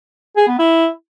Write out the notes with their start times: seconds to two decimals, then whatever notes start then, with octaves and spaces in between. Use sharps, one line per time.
0.37 G#4
0.48 B3
0.59 E4